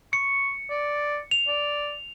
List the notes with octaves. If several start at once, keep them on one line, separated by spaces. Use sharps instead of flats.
C#6 C#7
D5
F7
D5